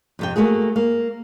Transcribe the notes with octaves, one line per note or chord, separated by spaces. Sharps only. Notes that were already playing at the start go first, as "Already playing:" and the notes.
F2 C3 G5
A3 A#3 F#4 G#4
A#3